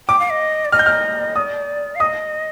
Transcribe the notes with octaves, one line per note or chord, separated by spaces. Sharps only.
G5 D6
F5
D#5
D5
D#5 F6
G6
F6
D5 D#6
F5
D#5 D#6